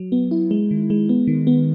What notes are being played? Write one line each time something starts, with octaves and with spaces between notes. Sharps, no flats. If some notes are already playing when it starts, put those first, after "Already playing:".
Already playing: F#3
B3
E4
G#3
D#3
G#3
B3
D#3
B3